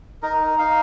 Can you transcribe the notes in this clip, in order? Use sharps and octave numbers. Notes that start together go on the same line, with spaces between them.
D#4 A#4
D#4 F5